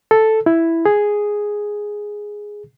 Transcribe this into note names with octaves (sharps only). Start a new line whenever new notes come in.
A4
E4
G#4